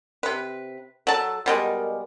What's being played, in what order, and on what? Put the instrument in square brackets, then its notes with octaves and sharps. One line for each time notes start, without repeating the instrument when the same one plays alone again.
[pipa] C3 B4
[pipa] F#3 A5 [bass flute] A4
[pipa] B2 G3 G#3 [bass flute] A#4